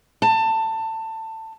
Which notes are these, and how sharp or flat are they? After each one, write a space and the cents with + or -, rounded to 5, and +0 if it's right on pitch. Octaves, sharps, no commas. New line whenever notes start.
A5 +20